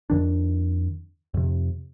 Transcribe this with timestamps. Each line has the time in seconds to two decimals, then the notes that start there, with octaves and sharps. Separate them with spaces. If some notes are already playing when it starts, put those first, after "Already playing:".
0.10 F2 D#3 D4
1.34 F2 C3